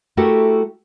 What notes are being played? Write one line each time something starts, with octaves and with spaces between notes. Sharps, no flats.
A3 E4 F#4 G4 A4 A#4